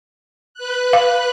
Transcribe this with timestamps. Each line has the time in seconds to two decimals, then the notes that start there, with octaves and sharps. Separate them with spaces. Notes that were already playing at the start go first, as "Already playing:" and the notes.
0.54 B4 F#6
0.93 F5